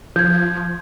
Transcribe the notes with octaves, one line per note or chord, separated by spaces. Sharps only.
F3 G6 G#6